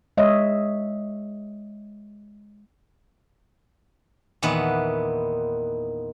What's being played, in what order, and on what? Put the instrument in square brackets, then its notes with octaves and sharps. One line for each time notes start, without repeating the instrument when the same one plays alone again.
[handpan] G#3 C#5 D#5 E5
[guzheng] E2 A#2 D#3 B4 F#5